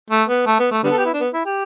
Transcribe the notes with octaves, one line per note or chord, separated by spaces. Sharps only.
A3
B3
A3
B3
A3
D3 G3 B3
A4
G4
E4
D4
B3
E4
G4